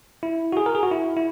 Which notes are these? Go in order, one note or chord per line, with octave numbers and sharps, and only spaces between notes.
E4
F#4
G#4
A#4
G#4
F#4
E4
E4